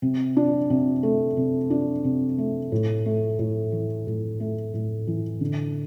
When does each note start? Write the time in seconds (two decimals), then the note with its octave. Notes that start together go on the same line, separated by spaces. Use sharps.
0.02 C3
0.37 D4
0.70 C3
1.03 A3
1.37 C3
1.70 D4
2.04 C3
2.38 A3
2.72 A2
3.06 A3
3.39 A2
3.72 E3
4.07 A2
4.40 A3
4.74 A2
5.07 E3
5.41 D3